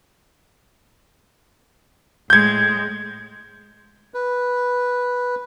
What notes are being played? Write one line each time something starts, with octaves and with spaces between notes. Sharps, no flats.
A2 G#3 G6 G#6
B4